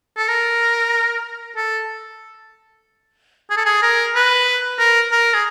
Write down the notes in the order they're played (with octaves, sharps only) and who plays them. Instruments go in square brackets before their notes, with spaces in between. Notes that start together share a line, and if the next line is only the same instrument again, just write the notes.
[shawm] A4
A#4
A4
G#4
A4
G#4
A#4
B4
A#4
A#4
G#4